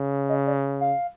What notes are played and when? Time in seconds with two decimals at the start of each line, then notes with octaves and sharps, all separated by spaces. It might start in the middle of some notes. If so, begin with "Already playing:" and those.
Already playing: C#3
0.29 D#5
0.46 D5
0.81 F5